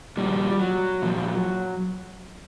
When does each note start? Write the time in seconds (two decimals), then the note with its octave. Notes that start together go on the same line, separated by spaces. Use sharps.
0.17 A#2 F3 G3
0.59 F#3
1.02 A#2 F3